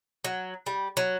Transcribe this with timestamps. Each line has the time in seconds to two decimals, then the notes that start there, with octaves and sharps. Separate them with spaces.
0.24 F#3
0.66 G3
0.97 F#3